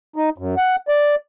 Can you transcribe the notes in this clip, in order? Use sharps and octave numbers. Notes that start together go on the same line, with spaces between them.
D#4
F#2
F#5
D5